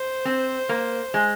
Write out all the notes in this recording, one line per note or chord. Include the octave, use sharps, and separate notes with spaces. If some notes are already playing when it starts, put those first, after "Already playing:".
Already playing: C5
C4
A#3
G#3